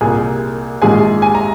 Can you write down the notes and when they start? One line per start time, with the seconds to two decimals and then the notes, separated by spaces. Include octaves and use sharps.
0.01 C2 A#2 G3 G#4 G#5
0.82 A#1 G#2 D#3 G#3 G#4 G#5
1.22 G#5
1.35 A#5